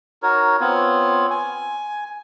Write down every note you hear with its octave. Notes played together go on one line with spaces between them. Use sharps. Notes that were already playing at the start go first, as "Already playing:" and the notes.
D#4 F#4 A#4 C#5
B3 C4 F4 C#5
G#5